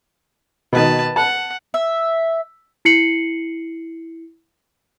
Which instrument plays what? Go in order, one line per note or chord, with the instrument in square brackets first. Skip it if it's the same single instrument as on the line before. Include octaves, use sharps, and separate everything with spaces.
[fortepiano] B2 D#3 [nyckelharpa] B4 A5
[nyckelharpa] F#5 [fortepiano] A5
[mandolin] E5
[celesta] E4 C7 C#7 F#7